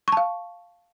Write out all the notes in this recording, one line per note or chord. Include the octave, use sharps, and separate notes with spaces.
F5 A5 C#6